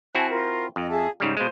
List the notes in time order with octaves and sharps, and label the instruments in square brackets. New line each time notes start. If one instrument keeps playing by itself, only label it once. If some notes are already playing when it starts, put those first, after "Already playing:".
[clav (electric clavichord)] C4 E4 F#4 [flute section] G#5 A5 F#6
[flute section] F4 A#4
[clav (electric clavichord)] F2 [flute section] D#5
[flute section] G#4 E5 A5
[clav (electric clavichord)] G#2 C#3 G3 [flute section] D#4
[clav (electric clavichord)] B2 G#3 [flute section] C5 F5